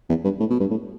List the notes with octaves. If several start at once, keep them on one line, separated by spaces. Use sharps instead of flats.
E2
G2
A2
B2
G2
A2